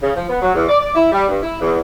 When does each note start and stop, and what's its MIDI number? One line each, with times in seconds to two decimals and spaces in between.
0.02 0.12 49
0.16 0.26 53
0.30 0.39 59
0.42 0.53 54
0.55 0.65 40
0.69 0.77 74
0.81 0.94 74
0.95 1.09 64
1.12 1.28 55
1.29 1.39 43
1.43 1.58 64
1.61 1.79 40